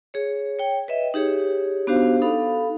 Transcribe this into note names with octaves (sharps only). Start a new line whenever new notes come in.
G#4 C#5
C#5 G5
B4 D#5 E5
D#4 G4 G#4 C#5
B3 D4 F#4 G4 C5 F5
D#4 A4 F5 B5